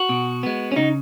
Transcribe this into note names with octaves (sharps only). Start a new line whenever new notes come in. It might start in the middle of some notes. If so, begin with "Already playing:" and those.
Already playing: F#4
B2
G#3 B3
C#4
C#3 D#4